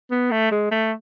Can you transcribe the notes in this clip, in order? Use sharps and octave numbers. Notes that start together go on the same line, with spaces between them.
B3
A3
G#3
A3